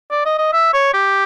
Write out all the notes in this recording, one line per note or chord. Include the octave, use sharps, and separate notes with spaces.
D5
D#5
D#5
E5
C#5
G4